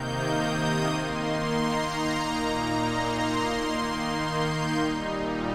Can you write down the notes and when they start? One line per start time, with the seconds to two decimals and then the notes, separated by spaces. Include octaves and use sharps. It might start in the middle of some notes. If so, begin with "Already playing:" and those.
Already playing: C3 D#3 A#3 D#4 G6
0.22 D#6
0.87 D#3 A#3 D#4 C6
1.52 A#5
2.16 A#2 A#3 D#4
2.81 C6
3.46 D#3 A#3 D#4
4.11 G6
4.76 A#2 G3 D#4